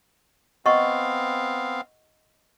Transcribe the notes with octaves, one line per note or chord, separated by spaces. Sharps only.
B3 C4 D#5 F5 F#5 C#6